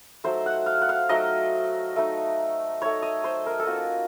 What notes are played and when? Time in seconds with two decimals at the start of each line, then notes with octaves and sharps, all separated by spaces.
0.24 F#3 A3 D#4 C5
0.46 F#5
0.66 F5
0.82 F#5
0.89 F5
1.09 F#3 A3 D#4 D#5
1.96 A3 D#4
2.82 A3 D#4 C#5
3.02 D#5
3.24 C5
3.46 A#4
3.59 A4
3.67 A#3 C#4 F4 F#4